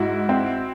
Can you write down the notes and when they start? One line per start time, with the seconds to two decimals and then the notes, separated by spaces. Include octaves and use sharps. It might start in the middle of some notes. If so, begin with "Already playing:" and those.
Already playing: G#2 E4 F#4
0.29 C4